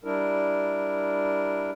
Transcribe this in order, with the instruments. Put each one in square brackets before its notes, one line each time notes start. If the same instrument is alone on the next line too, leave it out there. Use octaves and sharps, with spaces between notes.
[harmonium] G3 D4 E4 A#4